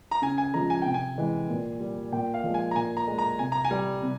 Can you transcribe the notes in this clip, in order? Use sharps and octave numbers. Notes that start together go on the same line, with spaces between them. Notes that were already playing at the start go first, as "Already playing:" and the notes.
A#5
C#3 G#5
G#5
F3 G#3 A#5
G#5
C3 G5
G#5
E3 G#3
A#2
G3
A#2 G5
F5
F3 G#3
G#5
A#5
A#2 G#5
A#5
G#3
A#5
C3 G#5
A#5
G#5
G3
C3